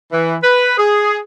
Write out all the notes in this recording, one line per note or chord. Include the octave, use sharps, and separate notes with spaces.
E3
B4
G#4